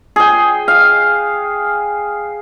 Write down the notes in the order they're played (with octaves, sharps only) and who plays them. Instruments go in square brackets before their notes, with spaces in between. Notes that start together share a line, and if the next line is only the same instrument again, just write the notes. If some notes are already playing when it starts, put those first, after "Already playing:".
[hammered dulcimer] G#4 G5
F5